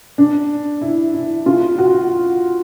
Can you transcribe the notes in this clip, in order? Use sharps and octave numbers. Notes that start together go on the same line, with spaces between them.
D4
E4
E4
F4
F#4